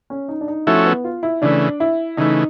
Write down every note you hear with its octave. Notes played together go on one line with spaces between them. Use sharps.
C#4
D#4
D4
D#4
F3 A3 C#4 E4 F#4 A4
B3
F4
E4
C#3 E3 A3 D4
E4
C#3 E3 A3 D#4